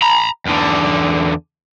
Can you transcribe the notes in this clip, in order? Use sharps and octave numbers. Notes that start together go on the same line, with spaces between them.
A#5 B5
E2 D3